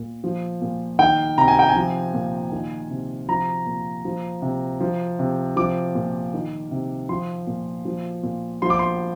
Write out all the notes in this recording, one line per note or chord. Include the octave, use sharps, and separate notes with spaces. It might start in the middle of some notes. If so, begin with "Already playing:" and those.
Already playing: A#2
F3
A#2
D#3 G5
C3 A#5
G#5
G5
G#5
F3
A#2
D#3
C3
F3 A#5
A#2
F3
C3
F3
C3
F3 D6
A#2
D#3
C3
F3 C6
A#2
F3
A#2
F3 C6
D6
C6